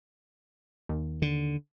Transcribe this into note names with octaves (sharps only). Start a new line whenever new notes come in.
D#2
D3